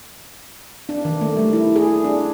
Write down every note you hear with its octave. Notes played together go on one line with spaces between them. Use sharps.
D4
D#3
A3
G3
E4
G#4
D4